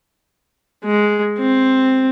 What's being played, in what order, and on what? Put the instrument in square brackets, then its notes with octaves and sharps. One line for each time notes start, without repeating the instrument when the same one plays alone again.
[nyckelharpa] G#3
C4